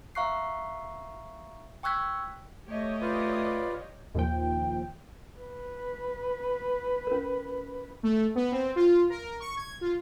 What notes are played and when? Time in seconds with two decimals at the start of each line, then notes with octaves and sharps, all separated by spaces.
0.15 E5 F5 A#5 C#6 F#6 C7
1.83 G5 C#6 E6 F#6 G#6 B6
2.66 A3 G4 C#5 D#5
3.01 F4 B4 D5
4.15 D#2 A#2 F3 G5
5.40 B4
7.07 C#4 A#4
8.03 A3
8.35 B3
8.52 C4
8.76 F4
9.10 A#4
9.40 C#6
9.57 G#6
9.81 F4